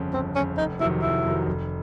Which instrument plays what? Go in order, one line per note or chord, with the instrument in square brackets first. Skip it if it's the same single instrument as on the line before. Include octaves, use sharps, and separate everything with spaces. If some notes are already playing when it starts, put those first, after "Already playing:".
Already playing: [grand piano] G1 F2 C#3
[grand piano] G1 [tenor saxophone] C4
[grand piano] F2 C#3 [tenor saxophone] C#4
[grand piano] F1 [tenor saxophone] D#4
[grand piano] F2 C3 D#3 F#3 [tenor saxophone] E4
[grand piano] F1 [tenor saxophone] E4
[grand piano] F2 C3 D#3 F#3
F1